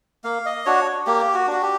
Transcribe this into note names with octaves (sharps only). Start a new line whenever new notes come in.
A#3 F5
D#5
D4 F#4 C#5
A#3 G4
F#4
D4 F#4
G4